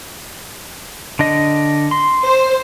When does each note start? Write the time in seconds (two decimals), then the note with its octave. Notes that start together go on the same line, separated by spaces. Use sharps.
1.19 D3 D4 D#5
1.91 C6
2.25 C5